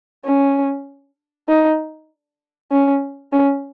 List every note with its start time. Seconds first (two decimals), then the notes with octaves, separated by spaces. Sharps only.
0.25 C#4
1.49 D#4
2.72 C#4
3.33 C#4